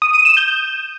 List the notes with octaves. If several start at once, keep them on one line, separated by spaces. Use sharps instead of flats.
D#6
D#7
E7
G6